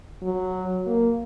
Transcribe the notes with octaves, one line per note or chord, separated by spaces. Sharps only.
F#3
A#3